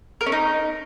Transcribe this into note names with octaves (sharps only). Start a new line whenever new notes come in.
A#4
C#4
D#4